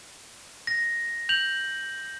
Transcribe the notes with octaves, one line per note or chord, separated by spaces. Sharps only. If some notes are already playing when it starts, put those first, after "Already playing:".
A#6
G6 F7 F#7